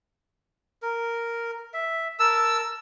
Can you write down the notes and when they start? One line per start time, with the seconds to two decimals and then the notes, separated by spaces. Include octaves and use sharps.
0.82 A#4
1.74 E5
2.20 A#4 A5 E6